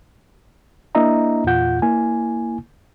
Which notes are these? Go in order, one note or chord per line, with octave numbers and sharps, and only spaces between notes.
A#3 D4 E4 D#5 E5 A#5
E2 A#2 F4 F#5 G6
A#3 E4 G#5